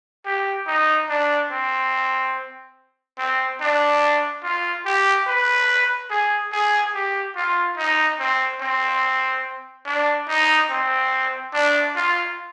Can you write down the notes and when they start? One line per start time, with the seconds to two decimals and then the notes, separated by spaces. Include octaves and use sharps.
0.26 G4
0.67 D#4
1.09 D4
1.51 C4
3.18 C4
3.60 D4
4.43 F4
4.85 G4
5.27 B4
6.10 G#4
6.52 G#4
6.94 G4
7.36 F4
7.77 D#4
8.19 C4
8.61 C4
9.86 D4
10.28 D#4
10.70 C4
11.53 D4
11.95 F4